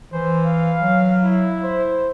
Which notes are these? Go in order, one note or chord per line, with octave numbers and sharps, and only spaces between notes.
E3 C5
F5
F#3
E4
C5